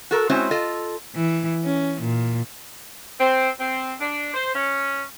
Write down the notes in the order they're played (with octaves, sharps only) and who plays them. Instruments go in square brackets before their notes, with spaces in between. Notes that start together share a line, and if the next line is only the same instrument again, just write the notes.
[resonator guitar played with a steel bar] F#4 A4 A#4
G#3 C4 C#4 E4 F#4 C5
F4 A4 D#5
[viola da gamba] E3
C#4
A#2
[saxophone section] C4
C4
D4
C5
C#4